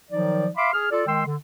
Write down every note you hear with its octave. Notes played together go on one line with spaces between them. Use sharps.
D#3 F3 F#3 D#4 D5
E5 F5 B5 C6 D6
G#4 F6
F4 A4 D5
D#3 G#3 G5 C6 E6
D3